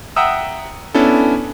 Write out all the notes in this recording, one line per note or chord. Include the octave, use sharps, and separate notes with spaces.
E5 F#5 G5 A#5 D#6 E6
B3 C#4 D4 E4 A4